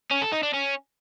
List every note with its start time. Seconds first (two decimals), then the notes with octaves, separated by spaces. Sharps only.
0.11 C#4
0.22 A4
0.32 D#4
0.43 D4
0.53 C#4